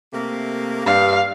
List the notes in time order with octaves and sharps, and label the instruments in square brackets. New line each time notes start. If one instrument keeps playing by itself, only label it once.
[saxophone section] C3 A3 A#3
[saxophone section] G2 [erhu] F5